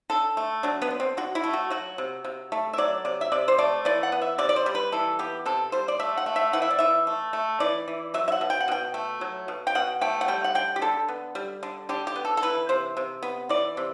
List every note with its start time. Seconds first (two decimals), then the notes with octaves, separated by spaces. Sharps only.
0.10 D3 A4
0.37 A3
0.63 F#3 D4
0.82 B3
0.91 D3
1.00 C4
1.17 D3 F#4
1.35 E4
1.44 A3
1.54 F#4
1.70 F#3 F#4
1.98 C3
2.25 C3
2.52 A3
2.73 E5
2.78 F#3 D5
3.05 C3 D5
3.21 E5
3.32 C3 D5
3.48 C5
3.58 A3 D5
3.85 E3 D5
4.03 F#5
4.12 B3
4.22 E5
4.38 C3 D5
4.49 D5
4.56 C5
4.66 G3
4.75 B4
4.92 E3 A4
5.19 B3 G4
5.46 C3 A4
5.72 G3 C5
5.88 D5
5.99 A3 E5
6.18 F#5
6.26 A3
6.36 E5
6.53 E3 F#5
6.62 E5
6.71 D5
6.79 E3 E5
7.07 A3
7.33 A3
7.60 E3 D5
7.88 E3
8.14 F#3 E5
8.28 E5
8.32 F#5
8.41 B2
8.50 G5
8.60 F#5
8.68 B2 G5
8.94 A3
9.21 F#3
9.48 B2
9.67 G5
9.75 B2 F#5
10.01 A3 G5
10.21 F#5
10.28 G3 G5
10.44 F#5
10.55 D3 G5
10.76 G4
10.82 D3 A4
11.09 B3
11.35 G3
11.63 D3
11.89 D3 G4
12.07 G4
12.16 B3
12.25 A4
12.37 A4
12.42 E3 B4
12.69 C3 C5
12.97 C3
13.23 B3
13.49 E3 D5
13.77 C3